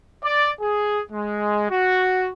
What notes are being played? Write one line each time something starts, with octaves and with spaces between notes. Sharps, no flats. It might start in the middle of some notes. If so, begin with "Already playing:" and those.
D5
G#4
G#3
F#4